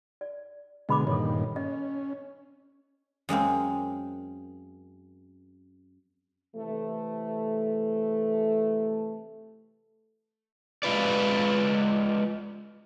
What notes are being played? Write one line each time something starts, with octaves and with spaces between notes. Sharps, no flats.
D5
B2 D3 G#3 D#5 B5 D6
G2 A#2 D#3 A4 C#5
C#4 D#5
F#2 G#3 A#3 C4
C3 E3 A3
G#3 F4 B4 D5